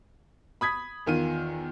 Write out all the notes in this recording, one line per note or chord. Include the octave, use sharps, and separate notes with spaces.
B5 D#6 G#6 B6
E2 D#3 F4 D#7